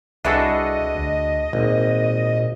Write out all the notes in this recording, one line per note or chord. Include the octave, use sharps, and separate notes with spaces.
C2 D4 F#4 G#4 A4 B4 D#5 E5
D2
G#1 A#2